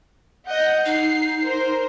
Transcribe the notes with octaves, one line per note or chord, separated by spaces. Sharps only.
D#5 F#5 G6
D#4 C7
A#4 C5